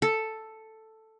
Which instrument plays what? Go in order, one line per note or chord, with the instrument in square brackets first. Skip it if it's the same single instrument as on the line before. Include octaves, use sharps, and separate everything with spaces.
[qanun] A4